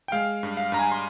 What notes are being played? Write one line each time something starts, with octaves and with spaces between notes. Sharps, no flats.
G5
G#3 F5
G2
F5
G2 A#5
G#5
C6